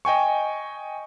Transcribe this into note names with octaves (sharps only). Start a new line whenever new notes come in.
D#5 G5 G#5 C#6